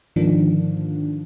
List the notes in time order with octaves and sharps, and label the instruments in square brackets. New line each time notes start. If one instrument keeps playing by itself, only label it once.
[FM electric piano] G#2 D3 D#3 F3 A#3 D4